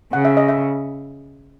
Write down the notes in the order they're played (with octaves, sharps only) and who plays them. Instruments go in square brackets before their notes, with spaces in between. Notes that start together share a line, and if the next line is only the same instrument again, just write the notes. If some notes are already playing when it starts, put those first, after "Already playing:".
[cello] C#3 [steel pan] F#5
[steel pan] E5
D#5
E5